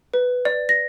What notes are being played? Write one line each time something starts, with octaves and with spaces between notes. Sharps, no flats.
B4
D5
A#6